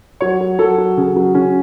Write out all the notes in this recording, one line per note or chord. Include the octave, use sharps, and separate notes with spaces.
F#3 C#5
F#3
F#3 A4
F#3
C#3
F#3
C#3 C#4